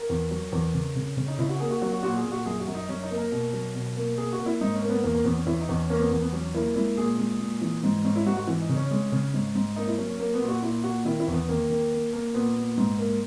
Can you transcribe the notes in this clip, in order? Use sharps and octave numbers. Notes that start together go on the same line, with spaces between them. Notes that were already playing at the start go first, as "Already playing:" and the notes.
Already playing: A#4
E2
F#3
E2
C#3
C#3
C#3 C#4
D#4
C#3 E4
F#4
A#3 G#4
F#4
F#3 F#4
F#4
A#2 F#4
G#4
A#2
F#4
F#2 G#4
F#4
F#2
D#4
F#2 C#4
D#4
A#3
A#4
B2
F#3
B2
A#3
A#3 G#4
F#4
A#3
E4
G#2 D#4
C#4
A#3
B3
E2 A#3
A#3
E2 B3
C#4
E2 E4
D#4
E2
C#4
A#3 C#4
B3
E2 A#3
B3
F#3 C#4
A#3 E4
G#3 E4
A#2 G#4
G#3
A#2
E3
G#2
G#2 C#4
E4
G#2 F#4
F#4
E3
D#4
C#3
C#4
G#3
C#3
G#2
G#2
A#3 D#4
E4
F#3 C#4
C#4
A#3
B3
A#2
F#4
A#2 E4
A#2 F#4
D#3 E4
E4
E2
B3
D#3 A#3
D#3
A#3
A#3
A#2 B3
A#2
G#2
A#3